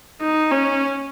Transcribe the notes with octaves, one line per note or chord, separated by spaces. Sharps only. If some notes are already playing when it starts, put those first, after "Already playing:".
D#4
C#4